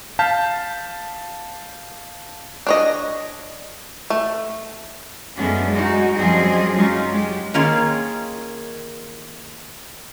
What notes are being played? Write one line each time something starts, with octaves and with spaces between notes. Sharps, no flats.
F5 A5 F6 G6 B6
D4 C#5 D#5
A3
F#2 G#3 A3 B3 C#4 D4
G#3 D#4 F#4
F#2 F3 G3 C4 G#4 D#5
F#3 G#3 C#4 D#4 F4
G#3 G4
D#3 A#3 C#4 F4 G#4